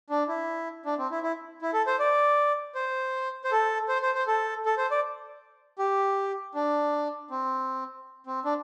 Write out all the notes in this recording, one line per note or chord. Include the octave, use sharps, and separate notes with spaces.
D4
E4
D4
C4
E4
E4
E4
A4
C5
D5
C5
C5
A4
C5
C5
C5
A4
A4
C5
D5
G4
D4
C4
C4
D4